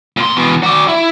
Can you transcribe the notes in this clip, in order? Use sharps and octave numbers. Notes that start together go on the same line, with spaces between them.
A#2 C6
E2 B2
F#4 D5
E4